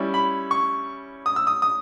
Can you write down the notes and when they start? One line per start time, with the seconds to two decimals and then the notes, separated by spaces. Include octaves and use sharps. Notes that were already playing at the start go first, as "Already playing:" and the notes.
Already playing: G3 C#4 E4
0.14 B5
0.51 C#6
1.26 D#6
1.36 E6
1.47 D#6
1.62 D#6